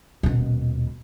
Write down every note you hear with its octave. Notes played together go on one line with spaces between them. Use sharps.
D#1 B2